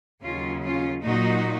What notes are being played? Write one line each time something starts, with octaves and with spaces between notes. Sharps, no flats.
D#2 C#3 F#3 C#4 F4
C#4 F4
A#2 F#3 D#4 F#4